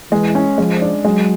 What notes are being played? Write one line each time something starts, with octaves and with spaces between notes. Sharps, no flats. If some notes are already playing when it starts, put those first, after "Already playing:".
E3 G#3
C#4
F3 G#3
D4
F#3 G#3